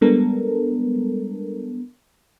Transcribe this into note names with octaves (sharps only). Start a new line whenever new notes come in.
G3 G#3 B3 D4 A4 A#4